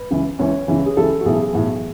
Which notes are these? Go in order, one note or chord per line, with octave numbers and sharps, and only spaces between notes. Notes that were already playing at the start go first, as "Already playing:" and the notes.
Already playing: B4
C#2 C#3 E3
C#2 C#3 E3 C#5
C#2 C#3 E3
G#4
C#2 C#3 E3 A4
F#4
B1 A2 E3 G#4
B1 A2 E3